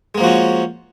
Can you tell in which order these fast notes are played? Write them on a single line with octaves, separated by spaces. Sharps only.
G#3 A#3 F3 F#4 C#4